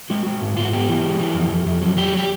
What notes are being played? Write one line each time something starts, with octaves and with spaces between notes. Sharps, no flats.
G#3 F#4
G#3
G#2
G#2 F4
F#4
B3 G4
E3
G#3
E3
F2
F2
F2
F#3
F#3 G4
G4